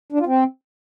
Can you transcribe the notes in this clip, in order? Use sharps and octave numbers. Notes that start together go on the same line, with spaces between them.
D4
F4
C4